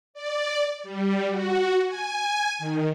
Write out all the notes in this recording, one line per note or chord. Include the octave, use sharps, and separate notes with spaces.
D5
G3
F#4
G#5
D#3